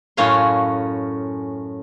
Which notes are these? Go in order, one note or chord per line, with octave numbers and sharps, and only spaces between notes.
F#2 A2 C#4 C#5 F5 C6